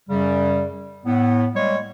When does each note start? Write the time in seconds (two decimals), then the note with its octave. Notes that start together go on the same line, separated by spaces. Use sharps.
0.09 F#2 C#3 G3
1.05 A2 B3
1.55 G3 G#3 A#3 C#5